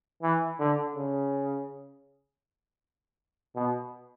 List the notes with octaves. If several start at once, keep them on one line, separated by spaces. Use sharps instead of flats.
E3
D3
C#3
B2